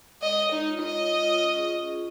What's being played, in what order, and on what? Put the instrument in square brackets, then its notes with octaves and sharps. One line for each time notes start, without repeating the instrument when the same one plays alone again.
[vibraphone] G#3 [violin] D#5
[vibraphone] C#5
[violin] D#4 [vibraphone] C#5
[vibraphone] F4
[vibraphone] F4 [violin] D#5
[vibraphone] C#5
F4
F4
C#4
G#4
C#4
G#4